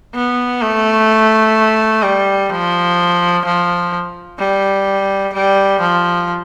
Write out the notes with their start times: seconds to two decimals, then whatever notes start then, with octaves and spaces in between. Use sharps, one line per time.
0.15 B3
0.62 A3
2.03 G3
2.50 F3
3.45 F3
4.39 G3
5.34 G3
5.81 F3